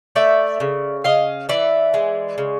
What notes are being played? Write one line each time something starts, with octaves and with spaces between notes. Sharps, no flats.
A3 D5 E5
C#3
C#3 D#5 F5
E3 D5 E5
G#3
C#3